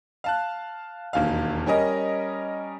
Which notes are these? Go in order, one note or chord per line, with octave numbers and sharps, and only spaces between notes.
F5 A5 F#6
E1 D#2 F5
G3 C#4 A#4 D#5